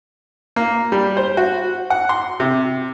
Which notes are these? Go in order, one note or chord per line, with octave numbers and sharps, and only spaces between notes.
A#3
G3
C5
F#4
F#5
C6
C3